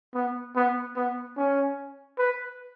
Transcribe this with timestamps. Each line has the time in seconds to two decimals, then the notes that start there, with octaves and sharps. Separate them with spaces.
0.14 B3
0.56 B3
0.96 B3
1.37 C#4
2.18 B4